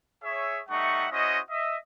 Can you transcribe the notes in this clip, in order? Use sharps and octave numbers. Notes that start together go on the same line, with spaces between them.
G#4 C#5 E5
G3 A3 D#4 E5 F#5 C#6
C#4 E4 F#4 C5 D#5
D#5 E5